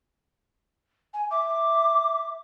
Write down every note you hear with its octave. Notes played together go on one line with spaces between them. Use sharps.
G#5
E5 D6